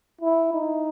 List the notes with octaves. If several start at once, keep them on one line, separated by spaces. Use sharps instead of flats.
E4
D#4